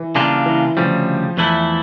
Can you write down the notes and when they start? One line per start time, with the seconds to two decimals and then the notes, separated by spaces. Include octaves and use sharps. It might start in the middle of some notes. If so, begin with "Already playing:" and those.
Already playing: E3
0.15 C#3 G3 A#3 D4 F4
0.46 E3
0.77 D2 C#3 F3 G3
1.37 E2 E3 A3 E4